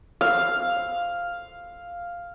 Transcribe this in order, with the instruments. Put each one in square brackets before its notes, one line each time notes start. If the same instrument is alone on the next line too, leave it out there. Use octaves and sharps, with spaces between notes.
[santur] F5